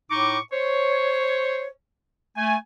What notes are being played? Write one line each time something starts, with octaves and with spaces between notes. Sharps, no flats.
A2 D#4 C#6 D6
C5 C#5
A3 G#5